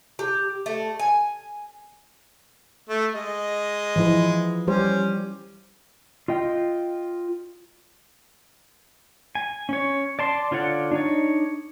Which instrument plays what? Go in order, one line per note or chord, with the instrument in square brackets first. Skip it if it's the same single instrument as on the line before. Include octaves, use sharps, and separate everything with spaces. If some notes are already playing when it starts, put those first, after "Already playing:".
[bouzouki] G4
A3
G#5
[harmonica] A3
G#3 D#5
[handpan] E3 F3 E4
[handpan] G3 G4 C5 [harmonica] C#4
[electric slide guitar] F4 D#5 G5
[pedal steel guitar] G#5
C#4 C#5
D5 A5 C6
D3 F4 C#5 D5 F#5
D4 D#4 C#5